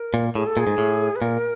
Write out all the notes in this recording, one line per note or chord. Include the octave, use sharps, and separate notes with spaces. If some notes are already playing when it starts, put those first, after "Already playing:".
Already playing: A#4
A#2
A2 G#4
A4
A#2 G#4
G#2
A2
B4
A#2 A#4